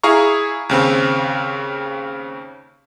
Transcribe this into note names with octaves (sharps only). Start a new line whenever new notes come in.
E4 G#4 F5 A#5 C#6
D#2 C#3 C4